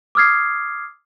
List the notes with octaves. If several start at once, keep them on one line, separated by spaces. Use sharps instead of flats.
D6 D#6 F6 G#6 C7